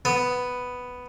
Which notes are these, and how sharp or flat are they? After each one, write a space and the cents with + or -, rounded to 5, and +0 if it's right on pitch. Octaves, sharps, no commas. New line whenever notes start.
B3 +5